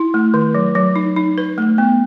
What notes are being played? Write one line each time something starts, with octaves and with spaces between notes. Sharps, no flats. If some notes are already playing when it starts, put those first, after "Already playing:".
Already playing: E4
A3
D#3
F#3
F#3
D#4
D#4
B4
A3
B3